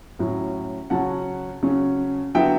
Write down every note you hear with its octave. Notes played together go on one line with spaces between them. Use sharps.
A2 F#3 C#4
C#3 F#3 C#4 F#5 A5
C#3 F#3 C#4
D3 F#3 B3 E4 E5 G5